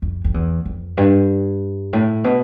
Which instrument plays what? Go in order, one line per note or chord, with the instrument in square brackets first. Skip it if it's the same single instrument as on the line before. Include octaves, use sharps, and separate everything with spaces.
[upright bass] F2
F2
E2
F2
G2
A2
B2